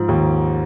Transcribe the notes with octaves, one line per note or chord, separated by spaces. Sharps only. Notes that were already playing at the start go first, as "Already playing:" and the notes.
Already playing: G#2 F3
D#2